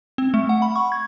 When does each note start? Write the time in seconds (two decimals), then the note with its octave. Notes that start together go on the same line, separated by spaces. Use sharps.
0.18 C4
0.34 A3
0.49 F#5
0.62 B5
0.76 C#6
0.92 G#6